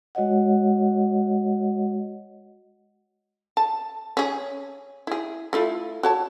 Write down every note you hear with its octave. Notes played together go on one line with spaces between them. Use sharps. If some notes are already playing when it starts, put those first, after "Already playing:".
G#3 F#4 C#5 D#5 F#5
A5
C#4 G#4
E4 G#4
A3 E4 F4
F#4 C#5 A5